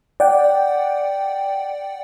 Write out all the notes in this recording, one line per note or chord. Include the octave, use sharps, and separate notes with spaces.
D5 F#5 G5